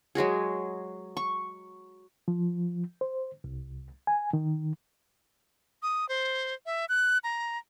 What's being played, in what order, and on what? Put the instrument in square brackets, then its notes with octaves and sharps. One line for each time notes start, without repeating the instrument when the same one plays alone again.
[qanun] F#3 G#3 F#4 G#4
C#6
[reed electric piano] F3
C5
C2
G#5
D#3
[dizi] D#6
C5
E5
F#6
A#5